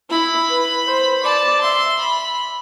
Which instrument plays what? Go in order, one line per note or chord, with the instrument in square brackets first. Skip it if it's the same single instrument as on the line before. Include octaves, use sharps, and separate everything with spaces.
[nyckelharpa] E4 [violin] B5
[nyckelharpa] B4
C5
[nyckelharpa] D5 [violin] A5
[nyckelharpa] E5 [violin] C6
[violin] B5